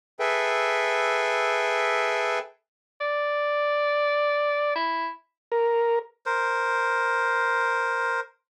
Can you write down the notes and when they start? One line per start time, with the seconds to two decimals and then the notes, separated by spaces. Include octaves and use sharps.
0.20 G#4 A4 B4 E5 G5
3.01 D5
4.76 E4
5.52 A#4
6.26 A#4 C5